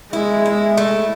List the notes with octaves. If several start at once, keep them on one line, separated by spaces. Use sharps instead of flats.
G#3 E4
E4
A3